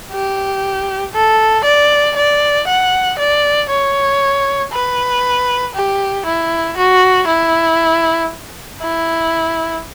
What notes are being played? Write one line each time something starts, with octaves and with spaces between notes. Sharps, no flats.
G4
A4
D5
D5
F#5
D5
C#5
B4
G4
E4
F#4
E4
E4